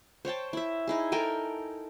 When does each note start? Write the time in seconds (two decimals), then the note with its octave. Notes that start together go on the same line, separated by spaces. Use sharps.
0.25 C5 C#5 G5 A5
0.53 E4 E5
0.87 D#4 E4 G#4
1.12 A4 A#4 G5 G#5